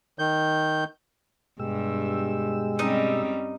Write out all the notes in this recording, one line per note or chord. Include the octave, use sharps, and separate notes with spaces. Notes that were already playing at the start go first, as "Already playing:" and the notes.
D#3 G6
G2 B2 G#3 G4 E6
G3 C4 C#4 D#4 D#5